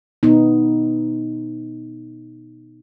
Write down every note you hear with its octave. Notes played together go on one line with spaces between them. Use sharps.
B2 B3 D#4